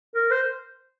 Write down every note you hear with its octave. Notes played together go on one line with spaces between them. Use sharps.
A#4
C5